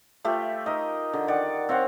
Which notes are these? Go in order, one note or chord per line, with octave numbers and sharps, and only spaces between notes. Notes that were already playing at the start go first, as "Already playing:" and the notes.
A3 F4 G4 E5
D#4 A#4 D#5
D3
D#3 D5 F#5
C4 C#5 F5 F#5